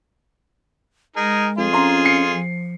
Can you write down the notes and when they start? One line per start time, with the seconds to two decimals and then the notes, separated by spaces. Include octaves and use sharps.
1.16 G#3 D#4 G#4 A#4
1.58 F2 F4 G#4
1.73 C#4 A#5 C6
2.05 C7 C#7
2.34 F3